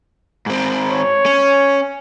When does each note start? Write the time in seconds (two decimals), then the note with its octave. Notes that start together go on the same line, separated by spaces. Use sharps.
0.46 G#2 C4
0.92 C#5
1.26 C#4